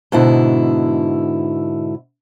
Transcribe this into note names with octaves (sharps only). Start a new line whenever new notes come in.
G#2 B2 D3 E4